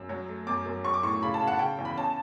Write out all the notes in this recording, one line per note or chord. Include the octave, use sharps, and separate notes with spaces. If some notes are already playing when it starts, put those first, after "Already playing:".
Already playing: F#2 E6
F#3
A3
F#2 D6
F#2
F#3 C#6
D6
A2 C#6
C#3 B5
A5
C#3
F#5
C#3 G5
E2
B5
C#4 A5